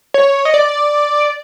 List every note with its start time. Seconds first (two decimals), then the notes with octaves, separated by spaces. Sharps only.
0.14 C#5
0.45 D#5
0.54 D5